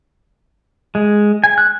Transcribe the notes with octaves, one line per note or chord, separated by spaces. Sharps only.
G#3
G#5
F#6